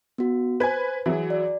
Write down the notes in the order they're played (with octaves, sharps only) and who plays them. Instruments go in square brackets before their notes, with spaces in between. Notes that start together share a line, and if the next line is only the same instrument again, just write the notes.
[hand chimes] B3 F#4
[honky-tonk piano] B4 G#5 [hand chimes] C5 G#6
[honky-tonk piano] E3 F#3 G#4 [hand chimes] F#4
[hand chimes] D5